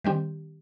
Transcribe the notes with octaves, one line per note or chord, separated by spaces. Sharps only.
D#3 G3 C4 G4